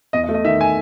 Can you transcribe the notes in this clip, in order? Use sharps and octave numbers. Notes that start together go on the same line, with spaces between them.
E2 D#5
D#5
A3
D#5
D#3 E5
G#5